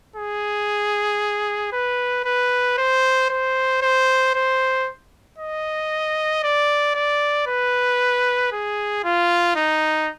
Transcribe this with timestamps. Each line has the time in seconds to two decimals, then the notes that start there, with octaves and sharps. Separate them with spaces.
0.16 G#4
1.73 B4
2.25 B4
2.78 C5
3.30 C5
3.82 C5
4.35 C5
5.38 D#5
6.43 D5
6.95 D5
7.47 B4
8.52 G#4
9.04 F4
9.56 D#4